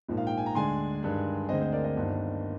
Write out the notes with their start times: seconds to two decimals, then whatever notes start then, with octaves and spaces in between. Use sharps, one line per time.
0.08 A#1 G#2 F3 A#3
0.17 F5
0.27 G5
0.37 G#5
0.46 A#5
0.55 D2 D3 G#3 D4 G#5 C6
1.03 G2 D#3 G#3 D4
1.49 D2 D3 G#3 C4 C5 D#5
1.61 C5
1.72 A#4 D5
1.84 C5 D#5
1.96 G1 G2 D#3 A#3 D4